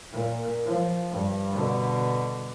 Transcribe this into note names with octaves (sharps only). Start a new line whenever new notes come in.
A#2
F3
G2
B2 D3